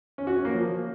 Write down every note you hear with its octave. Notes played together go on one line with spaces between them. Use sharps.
C#4
F#4
C#4
A#3
F3